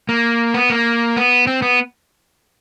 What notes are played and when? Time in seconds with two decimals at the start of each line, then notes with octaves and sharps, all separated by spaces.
0.09 A#3
0.54 B3
0.70 A#3
1.16 B3
1.47 C4
1.62 B3